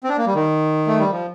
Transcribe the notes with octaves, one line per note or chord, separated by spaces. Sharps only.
C4
D4
A#3
G3
D#3
A3
G3
F3